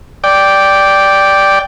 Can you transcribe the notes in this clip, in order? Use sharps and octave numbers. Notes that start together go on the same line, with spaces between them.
D5 G5